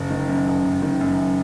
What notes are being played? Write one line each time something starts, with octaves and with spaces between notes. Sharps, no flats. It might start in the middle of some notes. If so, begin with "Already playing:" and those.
Already playing: F#1
D#3
F#2
F#1
F#1
D#3
F#2